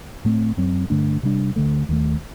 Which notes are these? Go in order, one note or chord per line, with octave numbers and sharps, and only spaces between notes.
A2 A3 C4
F#2 F#3 C4
G2 D3 A3 D4
C3 G3 D4
D2 D3 A3
D#2 D#3 A3